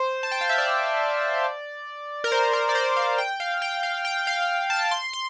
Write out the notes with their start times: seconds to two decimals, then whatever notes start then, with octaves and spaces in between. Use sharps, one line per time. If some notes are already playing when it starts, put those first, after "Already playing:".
Already playing: C5
0.23 A5
0.32 G5
0.41 F5
0.49 E5
0.58 D5
2.24 A#4
2.32 C5
2.53 A#4
2.69 D5
2.75 C5
2.97 F5
3.18 G5
3.40 F5
3.62 G5
3.83 F5
4.05 G5
4.27 F5
4.70 A5
4.91 C6
5.13 C6